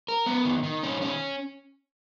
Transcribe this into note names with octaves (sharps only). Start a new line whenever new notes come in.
A#4
B3
D#3
D#3
C#4
C#4